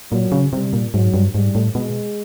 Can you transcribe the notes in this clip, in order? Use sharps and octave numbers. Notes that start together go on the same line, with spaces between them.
A#2 F#3
C#3
C3 G3
A#2
G#2 F#3
G2
G#2 G3
A2
B2 G#3